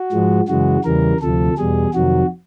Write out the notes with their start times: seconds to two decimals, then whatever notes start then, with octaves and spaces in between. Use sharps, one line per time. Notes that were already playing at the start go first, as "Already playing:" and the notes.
Already playing: F#4
0.12 G#2 F3 G#3
0.48 F#2 C#3 E3 G#3 F#4
0.85 E2 C#3 E3 G3 A#4
1.21 D2 C3 F3 A4
1.58 E2 B2 G3 G#4
1.94 F2 C3 D#3 F#3 F#4